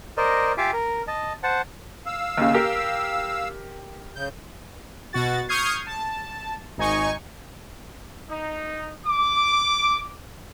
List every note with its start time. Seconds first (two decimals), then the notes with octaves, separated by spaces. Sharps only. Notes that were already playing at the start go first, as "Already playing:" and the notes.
0.17 A#4 C5 D5 D#5
0.58 F4 G4 E5 F5 G#5 D6
0.73 A#4
1.08 D#5 A5
1.43 C5 F#5 A5
2.06 F5 E6
2.38 D#2 C#3
2.54 G4 A#4
4.16 C#3 G6
5.13 B2 F#4 A6
5.49 C#6 D#6 F6 G6 G#6 C7
5.87 A5
6.78 G#1 D#4 G#5 C#6
8.29 D#4
9.06 D6